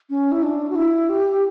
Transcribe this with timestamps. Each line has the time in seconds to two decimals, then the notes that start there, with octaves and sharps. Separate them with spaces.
0.10 C#4
0.32 E4
0.43 D4
0.70 F#4
0.76 E4
1.09 G4